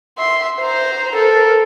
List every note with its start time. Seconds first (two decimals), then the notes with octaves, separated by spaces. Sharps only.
0.18 E5 C6
0.60 C5 A#5
1.15 A4 A#4